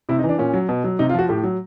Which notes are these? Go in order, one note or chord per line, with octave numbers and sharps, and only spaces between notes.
C3 E4
D#4
E3
D4
A#2 C#4
F#3
B2
F#3
C3 D#4
F4
F3 F#4
A2 G4
F#3